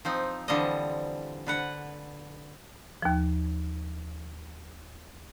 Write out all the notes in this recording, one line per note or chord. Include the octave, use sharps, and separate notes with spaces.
F3 C4 D#4
D3 E3 F3 G3 D#5
D3 B4 F#5
D#2 F3